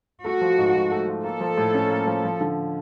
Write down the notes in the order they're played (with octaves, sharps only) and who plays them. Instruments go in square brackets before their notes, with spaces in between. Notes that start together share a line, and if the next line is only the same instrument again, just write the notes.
[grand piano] A3 [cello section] F#4
[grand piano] F3
G#2
G#2
A3
F3
[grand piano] A#3 [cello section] A4
[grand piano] F3
A2
C#4
A#3
F3
F3
D3